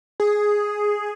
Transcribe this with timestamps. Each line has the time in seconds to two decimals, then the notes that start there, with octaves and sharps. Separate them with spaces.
0.20 G#4